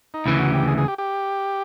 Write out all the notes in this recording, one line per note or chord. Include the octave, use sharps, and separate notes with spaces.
D#4
D2 C#3 E3 E4
F#4
G4
G#4
G#4
G4
G4